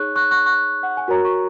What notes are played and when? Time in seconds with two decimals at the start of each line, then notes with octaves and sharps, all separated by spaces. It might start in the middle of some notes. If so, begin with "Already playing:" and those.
Already playing: D#4 G#4 C#5 C#6 F#6
0.16 C#6 F#6
0.31 C#6 F#6
0.46 C#6 F#6
0.83 F#5
0.97 G#5
1.08 F#4 A#4 C#5 A#5
1.25 C#6